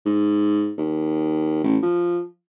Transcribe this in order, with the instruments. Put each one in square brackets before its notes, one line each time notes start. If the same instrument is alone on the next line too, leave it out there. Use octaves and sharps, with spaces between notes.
[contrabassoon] G#2
D#2
A1
F3